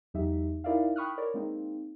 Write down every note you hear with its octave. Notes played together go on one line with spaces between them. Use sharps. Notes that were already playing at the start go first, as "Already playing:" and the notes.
E2 F#3 D#4 G4 E5
D#4 E4 A#4 D5 E5 F5
G5 B5 C#6 D#6 F6 F#6
A#4 C#5 D5
G#3 A#3 C4 D#4